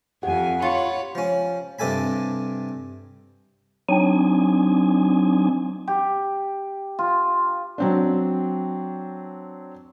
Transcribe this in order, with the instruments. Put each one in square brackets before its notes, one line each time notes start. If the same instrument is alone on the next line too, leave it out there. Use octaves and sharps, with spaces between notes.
[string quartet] F2 G#5 [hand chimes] G4 F#5
[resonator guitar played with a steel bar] F4 [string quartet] C#5 B5
[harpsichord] F3 C#4
G2 C3 A4 G#5 B5
[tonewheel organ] F#3 C4 D4 D#4 G#5
[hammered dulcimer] G4
F4
[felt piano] F#3 C4 D4